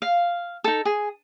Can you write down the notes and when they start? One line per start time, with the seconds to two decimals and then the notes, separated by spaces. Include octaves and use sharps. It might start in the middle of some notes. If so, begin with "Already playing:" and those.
0.02 F5
0.64 D#4 A4
0.85 G#4